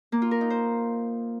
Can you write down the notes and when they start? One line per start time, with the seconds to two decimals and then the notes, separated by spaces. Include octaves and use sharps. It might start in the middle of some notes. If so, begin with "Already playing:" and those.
0.12 A#3
0.22 F4
0.31 A#4
0.41 D#4
0.50 C5